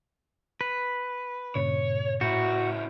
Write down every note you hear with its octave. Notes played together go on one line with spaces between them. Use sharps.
B4
G2 A#2 C#3 C#5
A2 C#3 E4 F#4 G6